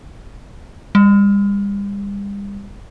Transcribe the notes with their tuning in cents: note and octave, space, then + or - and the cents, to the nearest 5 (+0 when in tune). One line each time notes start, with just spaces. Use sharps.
G3 +40